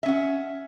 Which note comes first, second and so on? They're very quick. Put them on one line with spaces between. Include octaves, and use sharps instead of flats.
E5 C#4 F#5